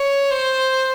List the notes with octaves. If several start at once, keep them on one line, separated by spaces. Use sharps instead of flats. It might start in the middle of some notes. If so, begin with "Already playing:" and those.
Already playing: C#5
C5